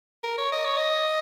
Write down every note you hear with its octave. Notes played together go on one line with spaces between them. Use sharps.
A#4
C#5
D#5
C#5
D#5